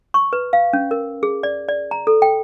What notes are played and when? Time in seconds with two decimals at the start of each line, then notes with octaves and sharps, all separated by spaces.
0.14 C#6
0.33 B4
0.53 F5
0.73 C#4
0.91 A#4
1.23 G#4
1.43 D5
1.68 D5
1.91 A#5
2.07 A4
2.22 G5